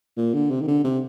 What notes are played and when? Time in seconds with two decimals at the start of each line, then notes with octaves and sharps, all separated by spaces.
0.17 A#2
0.34 D3
0.51 C3
0.62 D#3
0.68 D3
0.84 C3